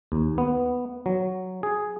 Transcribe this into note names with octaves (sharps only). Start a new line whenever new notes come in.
D#2
B3
F#3
G#4